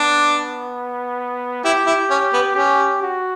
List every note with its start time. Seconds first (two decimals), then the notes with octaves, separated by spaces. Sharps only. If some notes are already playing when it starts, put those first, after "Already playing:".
Already playing: B3 D4
1.65 E4 G4
1.86 E4
2.10 C#4
2.33 B3
2.56 C#4 G4
3.02 F#4